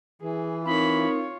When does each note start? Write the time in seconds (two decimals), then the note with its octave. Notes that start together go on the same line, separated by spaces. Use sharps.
0.22 E3 G#4
0.66 C4 D#4 F4 A#4 C#5 B5